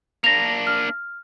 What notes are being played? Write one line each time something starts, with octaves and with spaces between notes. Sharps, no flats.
A#3 D4 A#6 F7
F6